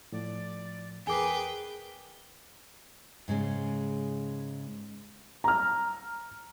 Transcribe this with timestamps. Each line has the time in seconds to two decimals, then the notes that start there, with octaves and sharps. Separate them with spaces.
0.12 A2 F3 D5
1.07 E2 G#4 A#4 B4 G5 G#5 D6
3.28 G#2 C#3 G#3 C#4
5.44 A#5 F6